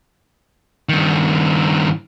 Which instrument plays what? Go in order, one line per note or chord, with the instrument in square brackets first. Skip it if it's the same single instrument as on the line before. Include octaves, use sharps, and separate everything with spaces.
[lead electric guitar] G2 D#3